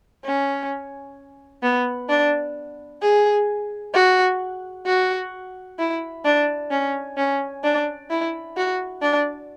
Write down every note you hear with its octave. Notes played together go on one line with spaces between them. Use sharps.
C#4
B3
D4
G#4
F#4
F#4
E4
D4
C#4
C#4
D4
E4
F#4
D4